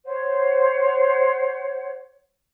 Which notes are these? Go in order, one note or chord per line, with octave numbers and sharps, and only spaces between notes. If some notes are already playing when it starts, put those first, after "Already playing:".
C5 C#5 F#5